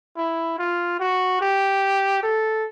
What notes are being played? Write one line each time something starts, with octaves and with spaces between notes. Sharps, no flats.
E4
F4
F#4
G4
A4